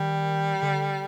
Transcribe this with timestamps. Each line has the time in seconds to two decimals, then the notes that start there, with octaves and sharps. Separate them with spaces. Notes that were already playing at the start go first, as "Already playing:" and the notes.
Already playing: D#3 G3
0.63 D3